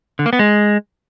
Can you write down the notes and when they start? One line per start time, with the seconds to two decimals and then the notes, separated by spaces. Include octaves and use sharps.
0.19 D3
0.26 A#3
0.33 B3
0.39 G#3